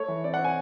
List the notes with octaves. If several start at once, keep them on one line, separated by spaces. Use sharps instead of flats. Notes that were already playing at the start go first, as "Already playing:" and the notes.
Already playing: A3 C#5
E3
C4 D5
F#5
C4
G#5